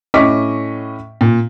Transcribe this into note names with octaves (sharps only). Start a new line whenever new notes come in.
A2 C#4 D#5 C#6 D6 B6
A#2